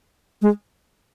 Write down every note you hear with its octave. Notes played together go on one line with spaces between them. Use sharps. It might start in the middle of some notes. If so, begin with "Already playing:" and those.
G#3